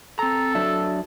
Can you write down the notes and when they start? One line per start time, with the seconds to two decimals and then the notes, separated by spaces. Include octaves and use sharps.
0.19 C4 A4 A#5
0.55 F#3 D4 E5